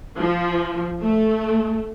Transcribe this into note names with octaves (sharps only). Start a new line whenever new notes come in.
F3
A3